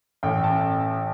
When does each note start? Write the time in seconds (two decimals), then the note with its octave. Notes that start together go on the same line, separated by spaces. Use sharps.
0.23 A1 G5
0.44 A5